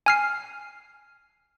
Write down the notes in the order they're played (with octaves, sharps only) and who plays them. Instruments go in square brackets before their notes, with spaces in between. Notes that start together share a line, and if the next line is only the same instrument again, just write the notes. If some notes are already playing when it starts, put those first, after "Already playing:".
[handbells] G#5 F6 C7